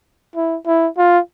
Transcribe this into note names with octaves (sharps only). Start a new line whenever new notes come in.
E4
E4
F4